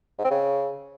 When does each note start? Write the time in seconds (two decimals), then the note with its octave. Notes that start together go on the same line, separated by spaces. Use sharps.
0.19 G#2
0.25 C4
0.31 C#3